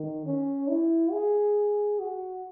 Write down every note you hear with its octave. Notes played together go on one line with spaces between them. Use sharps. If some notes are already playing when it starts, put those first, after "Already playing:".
Already playing: D#3
C#4
E4
G#4
F#4